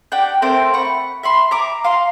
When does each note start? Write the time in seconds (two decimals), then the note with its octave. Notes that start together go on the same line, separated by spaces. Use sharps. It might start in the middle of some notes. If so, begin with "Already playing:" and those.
0.12 D4 G4 F#5 G5
0.42 A3 C4 A#4 C5
0.74 F#5 B5 C#6
1.23 E5 B5 C6
1.51 E5 A#5 D6
1.84 F5 A#5 C6